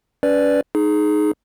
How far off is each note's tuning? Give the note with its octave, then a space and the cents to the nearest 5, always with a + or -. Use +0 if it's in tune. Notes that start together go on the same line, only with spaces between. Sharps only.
C#4 +40 B4 +0 D5 +0
D#4 -10 G#4 +20